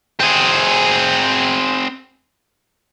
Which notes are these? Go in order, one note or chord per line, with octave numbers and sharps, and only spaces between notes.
C4 G#4